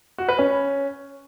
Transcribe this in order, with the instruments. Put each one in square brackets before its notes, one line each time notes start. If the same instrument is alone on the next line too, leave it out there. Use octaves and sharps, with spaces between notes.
[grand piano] F#4
B4
C#4